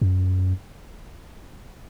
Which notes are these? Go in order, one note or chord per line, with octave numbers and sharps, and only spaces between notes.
F#2